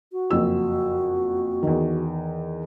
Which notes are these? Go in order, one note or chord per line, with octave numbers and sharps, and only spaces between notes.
F#4
F#1 F2 E6
E2 D#3